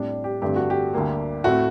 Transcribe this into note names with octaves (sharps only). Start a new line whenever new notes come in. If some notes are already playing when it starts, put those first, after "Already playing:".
Already playing: A2 G3 C4 D4
G4
G2 D3 A3 C4 G4
F#4
G4
D2 D3 G3 A#3
A2 A3 C4 F#4